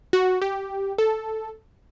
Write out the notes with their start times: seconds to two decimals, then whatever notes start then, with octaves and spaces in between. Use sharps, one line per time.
0.13 F#4
0.42 G4
0.98 A4